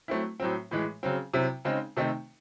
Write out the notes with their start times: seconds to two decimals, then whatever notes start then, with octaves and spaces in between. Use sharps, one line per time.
0.08 F#3 A3 C4 E4
0.40 A2 F#3 C4
0.71 A2 E3 G#3
1.03 C#3 F#3 C4
1.34 C3 F#3 C4 E4
1.65 C#3 G#3 C4 D#4
1.97 C3 D#3 A3 C4 D#4